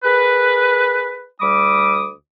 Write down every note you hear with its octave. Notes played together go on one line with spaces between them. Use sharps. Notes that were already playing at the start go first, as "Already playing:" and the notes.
G#4 A#4 B4
D2 G3 B5 D6 D#6